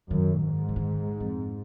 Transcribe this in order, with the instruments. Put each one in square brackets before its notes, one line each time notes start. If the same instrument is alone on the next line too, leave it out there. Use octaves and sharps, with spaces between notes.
[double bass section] F#2 [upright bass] D#3
[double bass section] G#2
[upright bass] F3
D#3
F2